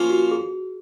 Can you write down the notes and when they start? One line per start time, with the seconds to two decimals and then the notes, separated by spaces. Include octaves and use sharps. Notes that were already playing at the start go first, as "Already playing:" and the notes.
Already playing: F3 A#3 C#4 F4 C5
0.10 F#4
0.31 G#4